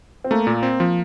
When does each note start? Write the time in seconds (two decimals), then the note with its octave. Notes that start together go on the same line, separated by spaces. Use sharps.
0.24 C4
0.31 A3 A#3
0.47 A#2
0.63 C4
0.80 F3